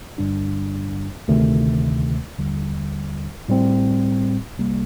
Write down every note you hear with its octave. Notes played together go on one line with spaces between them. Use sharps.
G1 G2 D3 G3 D4
D2 C3 D#3 A3
D#2 D3 G3
A2 G3 C4
C2 C3 G3 A#3